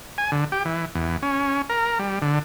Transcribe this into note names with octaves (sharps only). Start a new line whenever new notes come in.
G#5
D3
G4
E3
E2
C#4
A#4
G3
D3